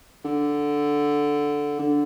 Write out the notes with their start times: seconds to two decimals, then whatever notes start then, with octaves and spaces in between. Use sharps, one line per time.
0.25 D3
1.79 D3